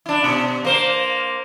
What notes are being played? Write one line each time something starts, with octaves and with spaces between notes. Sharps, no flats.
D4 E4
B2
A#3 C5